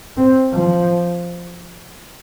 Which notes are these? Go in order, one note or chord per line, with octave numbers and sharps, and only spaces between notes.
C4
F3